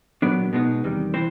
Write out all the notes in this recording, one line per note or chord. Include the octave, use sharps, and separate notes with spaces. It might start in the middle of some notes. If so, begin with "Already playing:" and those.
A#2 F#3 B3 D4 D5
B2 G#3 B3 D#4
E2 C3 D#3 G3
E3 C4 C5